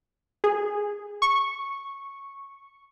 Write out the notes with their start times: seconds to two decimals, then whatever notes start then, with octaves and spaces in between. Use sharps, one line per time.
0.44 G#4
1.22 C#6